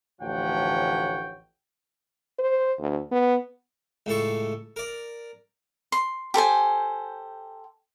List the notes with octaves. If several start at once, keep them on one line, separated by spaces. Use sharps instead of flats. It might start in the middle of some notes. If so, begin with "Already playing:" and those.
A1 D2 F3 C#5 F#5 G5
C5
D2
B3
C#2 A2 A4 C#6
A#4 D5
C6
G4 A4 C5 G#5